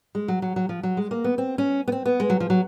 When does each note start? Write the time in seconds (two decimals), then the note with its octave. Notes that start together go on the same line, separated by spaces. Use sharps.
0.15 G#3
0.28 F#3
0.42 F#3
0.56 F#3
0.69 F3
0.83 F#3
0.97 G#3
1.11 A#3
1.24 B3
1.38 C4
1.58 C#4
1.88 B3
1.92 C4
2.06 B3
2.20 G#3
2.30 F#3
2.40 F3
2.50 F#3